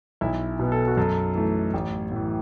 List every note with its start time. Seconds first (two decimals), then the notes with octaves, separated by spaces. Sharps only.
0.21 B1 E4
0.59 B2 B3
0.72 A4
0.88 F#4
0.97 F#2 A4
1.35 E3 A3
1.74 A1
2.11 A2 E3